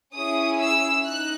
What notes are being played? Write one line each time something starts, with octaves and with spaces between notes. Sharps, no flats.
C#4 E4 G#4 D#6
E6
D#4 F#6